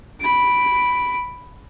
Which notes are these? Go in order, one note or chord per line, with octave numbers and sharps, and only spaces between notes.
B5 D7